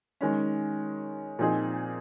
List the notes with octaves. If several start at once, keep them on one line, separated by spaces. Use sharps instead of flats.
D#3 G#3 C#4
A#2 F3 C4 D#4 G#4